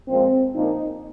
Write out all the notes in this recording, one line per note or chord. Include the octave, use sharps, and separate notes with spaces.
A#2 F3 G#3 C4
A#2 F3 A#3 D#4